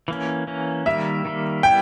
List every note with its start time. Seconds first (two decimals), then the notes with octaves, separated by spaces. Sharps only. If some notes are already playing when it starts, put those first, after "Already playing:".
0.08 E3 A#3 C#4
0.47 E3 A#3 C#4
0.86 D#3 G3 A#3 E5
1.25 D#3 G3 A#3
1.63 G3 B3 E4 G5